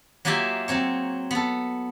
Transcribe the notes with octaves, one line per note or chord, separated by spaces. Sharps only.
F#3 A#3 F4 G4 G#4 E5
F#3 C4 C#5
B3 A4